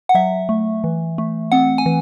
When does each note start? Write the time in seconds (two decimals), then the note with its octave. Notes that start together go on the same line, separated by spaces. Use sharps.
0.09 F#5
0.15 F#3 E5
0.49 A3
0.84 E3
1.18 A3
1.52 C4 F#5
1.78 G#5
1.86 E3